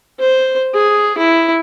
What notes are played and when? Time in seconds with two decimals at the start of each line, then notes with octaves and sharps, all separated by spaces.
0.20 C5
0.75 G#4
1.18 E4